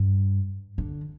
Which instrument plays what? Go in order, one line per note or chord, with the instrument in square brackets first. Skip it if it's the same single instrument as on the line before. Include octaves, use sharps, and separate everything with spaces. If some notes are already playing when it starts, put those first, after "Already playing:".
Already playing: [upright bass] G2
D3